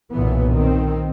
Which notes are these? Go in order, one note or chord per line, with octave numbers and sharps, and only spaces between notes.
B1 G2 A#2 E3 B3
D#3 C4